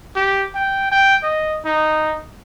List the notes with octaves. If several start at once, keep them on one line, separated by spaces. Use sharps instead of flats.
G4
G5
G5
D#5
D#4